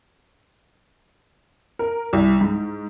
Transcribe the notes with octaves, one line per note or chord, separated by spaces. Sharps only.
A#4
C2
G#2